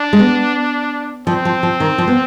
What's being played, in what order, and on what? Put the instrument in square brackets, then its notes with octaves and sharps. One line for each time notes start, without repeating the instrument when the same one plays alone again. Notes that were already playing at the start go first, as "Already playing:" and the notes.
Already playing: [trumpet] D4
[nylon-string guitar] G#3
B3
[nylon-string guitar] F3 [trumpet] C4
[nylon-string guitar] F3
F3
D#3
F3
B3